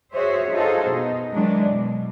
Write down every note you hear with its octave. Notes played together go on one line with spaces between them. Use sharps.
F#4 G#4 C5 C#5 E5
D#4 F4 F#4 G#4 A4 C5
B2 D#4
D#3 E3 F#3 G#3 D4
B2